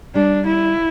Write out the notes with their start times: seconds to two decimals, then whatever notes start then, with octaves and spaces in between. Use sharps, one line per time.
0.15 G3 D4
0.46 E4